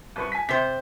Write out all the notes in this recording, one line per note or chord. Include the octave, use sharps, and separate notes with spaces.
C2 B4 C#6
G#5 B6
C3 C5 B6